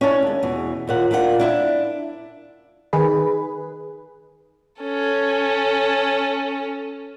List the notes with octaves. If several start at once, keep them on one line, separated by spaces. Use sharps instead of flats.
C#4 D4 E4 A5
D#2 G#3
E2 B2
D#2 A#2 F#5
A#2 A#3 D4 E4 F4 F#5
D4 E4 E5
D#3 G#4 B4
C#4 A4